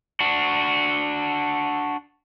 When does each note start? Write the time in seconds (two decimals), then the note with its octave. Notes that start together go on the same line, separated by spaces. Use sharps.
0.20 D4 F#4